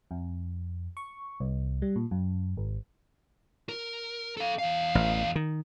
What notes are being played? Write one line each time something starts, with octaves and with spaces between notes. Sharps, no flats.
F2
C#6
C2
G3
A#2
F#2
G#1
A#4
A4 F5
E2 F5
A1
D#3